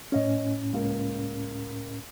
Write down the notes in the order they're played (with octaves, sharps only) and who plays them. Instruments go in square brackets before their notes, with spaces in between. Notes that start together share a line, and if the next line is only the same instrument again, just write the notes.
[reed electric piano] A2 C#4 [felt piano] C#5 D#5
[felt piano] C#2 A#3 A#4